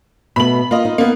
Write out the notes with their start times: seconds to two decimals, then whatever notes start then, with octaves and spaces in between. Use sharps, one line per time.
0.36 B2 A3 B3 B5 F#7
0.71 A#3 F4 D#5
0.85 D#4
0.98 A#3 B3